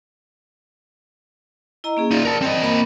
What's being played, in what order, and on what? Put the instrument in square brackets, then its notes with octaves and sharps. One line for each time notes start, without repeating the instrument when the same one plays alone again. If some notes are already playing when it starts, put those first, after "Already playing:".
[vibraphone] E4 D#5 A#5
A#3 C#4 G#4
[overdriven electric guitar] D#4 F4 [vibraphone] D5
[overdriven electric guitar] A#4 A5
C4 D#5
[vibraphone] A#3 A#4 B5